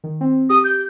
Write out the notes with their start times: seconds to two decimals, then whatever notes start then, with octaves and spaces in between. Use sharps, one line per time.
0.04 D#3
0.21 C4
0.50 G4 D#6
0.64 G6